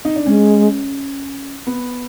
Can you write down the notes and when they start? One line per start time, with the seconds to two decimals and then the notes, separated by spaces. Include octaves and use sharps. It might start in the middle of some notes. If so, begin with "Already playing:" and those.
0.05 D#4
0.16 D4
0.26 G#3 C#4
1.67 B3